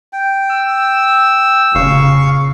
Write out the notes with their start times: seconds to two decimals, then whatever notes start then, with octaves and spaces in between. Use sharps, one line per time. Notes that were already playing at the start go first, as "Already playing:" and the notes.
0.13 G5
0.50 E6
1.75 F1 A#2 C#3 F5 C#6